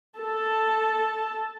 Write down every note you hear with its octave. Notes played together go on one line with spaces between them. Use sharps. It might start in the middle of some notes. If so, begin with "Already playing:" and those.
A4 A5